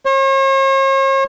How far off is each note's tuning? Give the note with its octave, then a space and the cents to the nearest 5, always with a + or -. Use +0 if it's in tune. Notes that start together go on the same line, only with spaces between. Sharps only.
C#5 -45